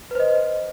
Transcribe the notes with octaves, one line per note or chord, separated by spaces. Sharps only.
B4 C5 D#5